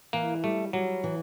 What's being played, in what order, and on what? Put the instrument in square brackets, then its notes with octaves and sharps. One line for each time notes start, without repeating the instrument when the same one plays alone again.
[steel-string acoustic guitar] E3 [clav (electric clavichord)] A#3
[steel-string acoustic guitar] G3 [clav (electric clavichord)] A3
[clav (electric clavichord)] F#3 [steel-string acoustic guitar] G3
[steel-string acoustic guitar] E3